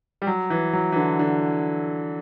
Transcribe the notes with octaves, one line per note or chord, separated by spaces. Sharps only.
G3
F#3
E3
F#3
E3
D3
D3